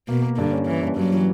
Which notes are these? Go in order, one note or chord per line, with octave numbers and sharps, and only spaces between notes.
B2 A#3
A#3
G2 D3
C#4
E3 C#4
G2
G2 F#3
E3